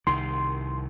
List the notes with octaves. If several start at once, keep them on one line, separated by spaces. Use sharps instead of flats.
C2 D#3 C6